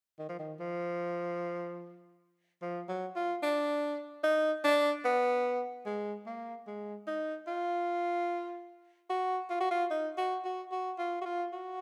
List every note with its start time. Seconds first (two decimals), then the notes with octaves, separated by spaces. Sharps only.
0.19 D#3
0.29 F3
0.39 D#3
0.59 F3
2.62 F3
2.89 F#3
3.16 F4
3.43 D4
4.24 D#4
4.64 D4
5.05 B3
5.86 G#3
6.26 A#3
6.67 G#3
7.07 D#4
7.47 F4
9.10 F#4
9.50 F4
9.60 F#4
9.71 F4
9.91 D#4
10.18 F#4
10.44 F#4
10.72 F#4
10.98 F4
11.21 F#4
11.25 F4
11.53 F#4